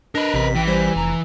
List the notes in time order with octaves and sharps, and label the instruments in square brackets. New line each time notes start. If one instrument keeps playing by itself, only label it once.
[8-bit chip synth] D4 [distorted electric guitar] A#4 B4 [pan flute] D#5
[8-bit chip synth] A1 B6 [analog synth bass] C3
[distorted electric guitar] E3 [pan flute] G5
[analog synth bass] G3 [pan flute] C5
[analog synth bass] F1 [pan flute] A#5